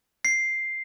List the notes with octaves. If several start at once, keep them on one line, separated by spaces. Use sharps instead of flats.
C7